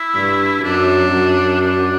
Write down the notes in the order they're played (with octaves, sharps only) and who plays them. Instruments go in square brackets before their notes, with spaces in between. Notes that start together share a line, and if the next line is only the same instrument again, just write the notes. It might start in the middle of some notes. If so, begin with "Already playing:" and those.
Already playing: [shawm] E4
[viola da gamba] G2
[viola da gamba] F#2 [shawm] D4
[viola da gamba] F#2
[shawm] D4